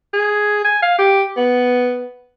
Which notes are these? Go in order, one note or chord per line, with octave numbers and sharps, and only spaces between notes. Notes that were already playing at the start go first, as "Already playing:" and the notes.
G#4
G#5
F5
G4
B3